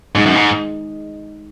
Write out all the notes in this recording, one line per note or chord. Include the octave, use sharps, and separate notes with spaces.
G#2 G#3 D#4 G#4 D#5
F#2
G#2